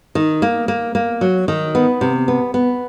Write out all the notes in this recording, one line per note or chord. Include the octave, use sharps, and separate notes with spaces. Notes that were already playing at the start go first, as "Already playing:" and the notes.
D#3
A#3
A#3
A#3
F#3
D#3
B3
C3
B3
B3